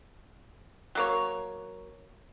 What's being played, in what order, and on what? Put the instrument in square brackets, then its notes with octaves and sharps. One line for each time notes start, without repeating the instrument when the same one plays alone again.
[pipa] F#3 A#3 C#5